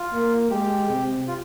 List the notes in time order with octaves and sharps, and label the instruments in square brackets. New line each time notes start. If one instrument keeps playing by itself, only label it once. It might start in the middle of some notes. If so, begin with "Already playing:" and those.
Already playing: [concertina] F4
[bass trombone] A#3
[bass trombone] G#3 [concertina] G4
[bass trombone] C3
[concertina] F4